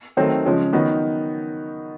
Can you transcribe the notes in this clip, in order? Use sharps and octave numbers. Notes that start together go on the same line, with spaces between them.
D#3 F#3 A3 C4
C#3 F3 G#3 C#4
D#3 F#3 B3 D#4 F#4